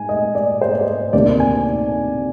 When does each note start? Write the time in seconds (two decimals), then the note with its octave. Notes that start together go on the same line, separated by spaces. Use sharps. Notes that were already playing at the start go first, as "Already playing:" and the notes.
Already playing: G#2 G#5
0.09 D#5
0.35 D5
0.61 C5
0.72 D5
0.81 C5
1.13 D2 C3 D#3 A#3 D4 D5
1.40 G#5